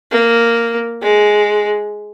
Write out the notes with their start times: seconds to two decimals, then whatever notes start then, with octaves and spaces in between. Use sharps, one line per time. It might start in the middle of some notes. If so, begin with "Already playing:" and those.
0.11 A#3
1.02 G#3